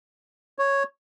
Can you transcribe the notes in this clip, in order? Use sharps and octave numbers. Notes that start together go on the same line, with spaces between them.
C#5